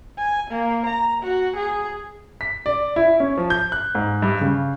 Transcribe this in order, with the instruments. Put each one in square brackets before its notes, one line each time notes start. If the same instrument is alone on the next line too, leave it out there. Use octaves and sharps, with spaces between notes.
[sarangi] G#5
A#3
A#5
F#4
G#4
[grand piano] B6
D5
E4
C#4
F3
G6
F#6
G#2
G2
C#3